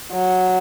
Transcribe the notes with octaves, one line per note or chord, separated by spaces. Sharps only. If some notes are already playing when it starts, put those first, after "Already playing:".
F#3